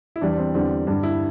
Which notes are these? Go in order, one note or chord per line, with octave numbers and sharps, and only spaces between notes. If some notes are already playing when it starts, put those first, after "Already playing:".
E4
E2 E3 G3 D4
C4
E2 D3 G3 C4
G2 D3 G3
E4